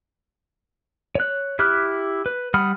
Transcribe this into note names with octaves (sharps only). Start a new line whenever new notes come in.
C#5 F#6
E4 G4 D6 F6 F#6
B4
G3 F#5 B5 D#6 F6